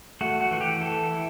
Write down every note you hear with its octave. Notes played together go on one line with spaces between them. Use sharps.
A3 F#4
F#4
E3 F#4
G4
E3 A4
E4